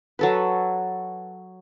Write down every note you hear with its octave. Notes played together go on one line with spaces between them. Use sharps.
F#3 A4 B4